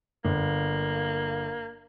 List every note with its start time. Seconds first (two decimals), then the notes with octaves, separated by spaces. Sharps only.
0.25 G1 A#3